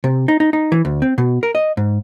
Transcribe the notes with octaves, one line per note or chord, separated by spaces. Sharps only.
C3
D#4
D#4
D#4
E3
D2
C4
B2
A#4
D#5
G#2